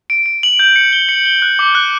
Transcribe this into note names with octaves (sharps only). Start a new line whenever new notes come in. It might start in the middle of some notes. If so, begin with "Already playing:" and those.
D7
D7
F#7
G6
C#7
G7
C#7
G7
F#6
D6
F#6